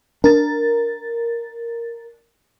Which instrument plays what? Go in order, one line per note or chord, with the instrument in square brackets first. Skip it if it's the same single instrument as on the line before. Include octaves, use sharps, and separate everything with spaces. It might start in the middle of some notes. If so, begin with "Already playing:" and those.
[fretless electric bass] D4 [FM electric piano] A#4 A6